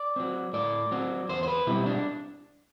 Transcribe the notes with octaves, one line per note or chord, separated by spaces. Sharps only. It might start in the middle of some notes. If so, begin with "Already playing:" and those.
Already playing: D5
F#3 C4
A2 D5
F#3 C4
E2 C5
C5
B4
B2 G3 C4 E4
D4